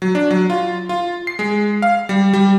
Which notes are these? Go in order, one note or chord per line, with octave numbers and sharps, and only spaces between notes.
F#3
D4
F#3
F4
F4
C7
G#3
F5
G3
G3